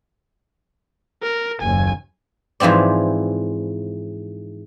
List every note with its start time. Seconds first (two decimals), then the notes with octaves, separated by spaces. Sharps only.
1.23 A#4
1.62 F#1 D#2 G#5
2.60 G#2 E3 F3 C4 D5